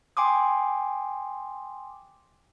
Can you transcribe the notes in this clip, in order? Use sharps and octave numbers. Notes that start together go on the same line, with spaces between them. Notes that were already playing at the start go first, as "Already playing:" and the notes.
G5 G#5 C6 D6 D#6